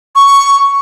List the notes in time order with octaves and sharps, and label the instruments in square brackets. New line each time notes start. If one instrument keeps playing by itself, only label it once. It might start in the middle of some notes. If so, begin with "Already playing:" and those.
[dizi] C#6